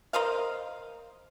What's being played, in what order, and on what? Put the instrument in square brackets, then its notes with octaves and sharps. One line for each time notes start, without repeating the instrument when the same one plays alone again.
[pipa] A#4 C5 D#5 F5